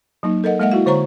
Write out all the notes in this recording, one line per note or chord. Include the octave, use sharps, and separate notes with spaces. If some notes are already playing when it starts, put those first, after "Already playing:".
F#3 A#3 D#4
A4 A#4 D#5 F#5
G#3 A#3 D#5 E5 F#5
E4 F#4 F5
D3 C5 C#5 A#5 C#6